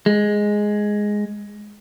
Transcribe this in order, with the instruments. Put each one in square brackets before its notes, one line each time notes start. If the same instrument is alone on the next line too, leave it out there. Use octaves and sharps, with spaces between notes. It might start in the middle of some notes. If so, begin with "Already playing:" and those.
[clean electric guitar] G#3